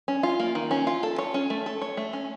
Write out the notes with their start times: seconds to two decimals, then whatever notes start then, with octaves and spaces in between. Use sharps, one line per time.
0.08 C#4
0.23 F4
0.40 A#3
0.55 D#3
0.71 C#4
0.87 F4
1.03 A4
1.18 C#5
1.34 C#4
1.50 A3
1.66 A4
1.82 C#5
1.97 A3
2.13 C#4